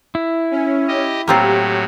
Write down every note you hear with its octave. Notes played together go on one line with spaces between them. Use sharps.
E4
C#4
G4 D#5
A2 F#3 A#3 C4 F4 G4